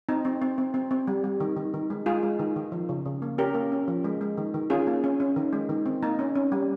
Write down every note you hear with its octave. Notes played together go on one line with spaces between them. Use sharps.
C4 D#4
C4
C4
C4
C4
C4
G3
G3
D#3
D#3
D#3
G#3
G#3 F4 G#4
G#3
D#3
D#3
F3
C#3
C#3
A#3
C#4 G4 A#4
A#3
C#4
F3
G#3
G#3
D#3
D#3
C#4 F4 G#4
A#3
C#4
C#4
D#3
G#3
D#3
C4
A#3 D#4
C#4
C#4
G3